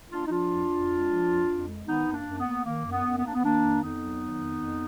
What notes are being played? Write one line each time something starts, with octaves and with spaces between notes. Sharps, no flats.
A#3 D4 F4
D#4
F3 D4 F4
F2
F2
G#3
F3
F2
F2
G#3
D#3 B3 D#4
F#2
A#3 D4
F#2
B3
A#3
D#3 A#3
F#2
B3
F#2
B3
A#3 D4
B3
D#3 A#3 D4
F2
F2 B3 D#4
F#3
D#3
F2
F2